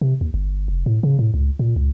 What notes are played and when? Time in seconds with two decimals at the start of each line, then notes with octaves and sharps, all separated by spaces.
0.01 C3
0.21 D#2
0.34 G1
0.68 F1
0.86 A2
1.03 C#3
1.19 A2
1.34 C#2
1.59 A#2
1.76 C#2